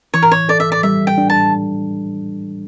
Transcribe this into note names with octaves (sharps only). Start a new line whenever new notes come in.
E3 C#5
A#4
C#5
A4 D5
E5
D5
G3 E5
G5
D4
A5